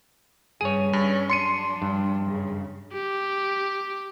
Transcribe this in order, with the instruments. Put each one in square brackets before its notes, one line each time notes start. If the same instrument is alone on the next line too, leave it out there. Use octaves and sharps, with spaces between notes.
[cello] G2 C#3 [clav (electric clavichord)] G#4 C#5 [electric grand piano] D#7
[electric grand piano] G2 [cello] C#4
[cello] F#3 D4 [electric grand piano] C6 C#7 D#7
[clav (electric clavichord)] G2
[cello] F#2 C#3
[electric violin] G4